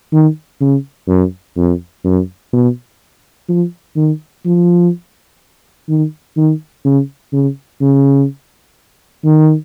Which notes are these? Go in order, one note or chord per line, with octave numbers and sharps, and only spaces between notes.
D#3
C#3
F#2
F2
F#2
B2
F3
D#3
F3
D#3
D#3
C#3
C#3
C#3
D#3